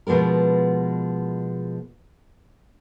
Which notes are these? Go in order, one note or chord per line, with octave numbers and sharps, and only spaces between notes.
B2 F3 G#3 B3 A#4